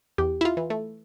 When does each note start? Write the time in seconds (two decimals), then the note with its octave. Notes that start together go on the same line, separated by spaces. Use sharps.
0.18 E2 G4
0.41 E4
0.45 F4
0.57 E3
0.70 A3